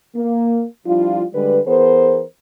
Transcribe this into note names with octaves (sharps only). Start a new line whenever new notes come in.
A#3
F3 G3 D4 E4 F4
D3 G3 G#3 B4
E3 B3 G#4 A#4 C5